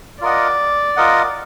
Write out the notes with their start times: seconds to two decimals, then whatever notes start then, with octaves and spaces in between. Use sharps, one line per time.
0.21 F4 A#4 D5 D#5 F#5
0.97 F4 A#4 D#5 F#5